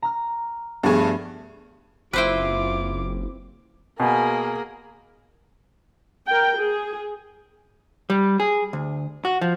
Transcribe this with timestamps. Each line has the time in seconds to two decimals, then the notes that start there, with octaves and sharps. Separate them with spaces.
0.02 A#5 F6
0.83 G2 F3 A3 B3 D4 G#4
2.13 F#1 C4 E4 F4 B4 C5 G5 D6
4.00 B2 A#3 G#4 G#5
6.27 A#4 G5
6.56 G#4
8.10 G3
8.40 G#4
8.73 D2
9.25 F#4
9.41 F3